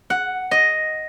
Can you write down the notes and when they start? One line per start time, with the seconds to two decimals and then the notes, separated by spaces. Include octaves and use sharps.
0.10 F#5
0.51 D#5